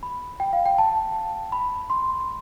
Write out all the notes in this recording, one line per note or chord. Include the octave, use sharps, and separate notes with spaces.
B5
G5
F5
G5
A5
B5
C6